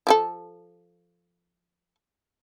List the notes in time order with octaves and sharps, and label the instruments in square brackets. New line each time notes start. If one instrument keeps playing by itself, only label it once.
[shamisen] F3 G4 A4